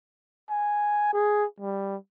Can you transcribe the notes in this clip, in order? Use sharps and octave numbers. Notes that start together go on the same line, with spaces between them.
G#5
G#4
G3